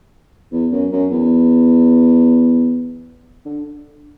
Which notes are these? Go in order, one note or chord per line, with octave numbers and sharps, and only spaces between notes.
E2
F#2
F#2
E2
D3